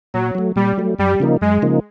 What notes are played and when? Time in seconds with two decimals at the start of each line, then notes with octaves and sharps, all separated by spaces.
0.14 A#2 F#3
0.35 F#3 A3
0.56 A#2 G3
0.78 F#3 A3
0.99 F#2 G3
1.20 C#3 F3 A#3 D#4
1.41 F#2 G#3
1.62 C#3 F3 A#3 D#4